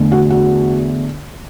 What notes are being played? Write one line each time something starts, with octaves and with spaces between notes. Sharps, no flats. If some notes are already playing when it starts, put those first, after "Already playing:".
Already playing: E2 D3 A3
F#4
F#4